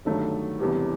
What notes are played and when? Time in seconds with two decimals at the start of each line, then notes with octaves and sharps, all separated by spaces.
0.05 G1 G2 D#3 F#3 A3
0.59 E1 E2 C3 E3 G3